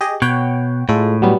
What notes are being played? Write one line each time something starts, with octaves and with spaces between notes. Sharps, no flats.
G4 G#4 D#5
B2 C#5 F#5 G5
A2 G#3 F4 A4
F#3 G3 B3